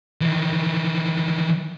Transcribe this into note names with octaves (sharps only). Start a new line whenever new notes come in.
D#3 E3